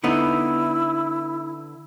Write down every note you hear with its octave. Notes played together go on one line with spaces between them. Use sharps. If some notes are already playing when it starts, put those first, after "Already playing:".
D3 B3 D#4 E4